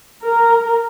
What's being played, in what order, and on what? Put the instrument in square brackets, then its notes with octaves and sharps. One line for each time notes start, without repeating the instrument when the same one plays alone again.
[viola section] A#4